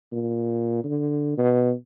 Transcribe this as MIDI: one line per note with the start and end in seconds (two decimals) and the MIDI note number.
0.12 0.80 46
0.84 1.36 50
1.37 1.73 47